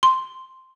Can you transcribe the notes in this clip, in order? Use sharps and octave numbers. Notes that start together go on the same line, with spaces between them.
C6